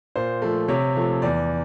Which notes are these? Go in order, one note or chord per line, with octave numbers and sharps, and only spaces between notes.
A#2 C5
F3 A3
C3 C#5
F3 A3
E2 D5